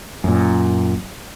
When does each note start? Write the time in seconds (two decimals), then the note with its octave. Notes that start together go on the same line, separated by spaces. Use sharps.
0.24 F#2 A#2